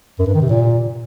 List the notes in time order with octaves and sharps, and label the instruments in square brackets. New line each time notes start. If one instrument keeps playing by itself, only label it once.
[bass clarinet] F#2
G2
D#3
C3
A#2